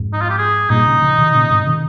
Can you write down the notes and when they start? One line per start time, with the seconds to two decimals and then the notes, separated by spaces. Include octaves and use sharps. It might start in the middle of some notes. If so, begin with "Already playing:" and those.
Already playing: F2 G#2
0.13 D#4
0.21 F4
0.30 G4
0.38 G#4
0.70 G2 A#2 D#4
0.86 A#2 C#3
1.02 C#3 F3
1.18 C3 D#3
1.34 A#2 C#3
1.51 G#2 C3
1.66 C3 D#3